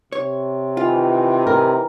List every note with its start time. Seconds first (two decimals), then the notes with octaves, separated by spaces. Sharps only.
0.12 C3 C#5
0.77 D#3 E3 F4
1.47 C3 A#4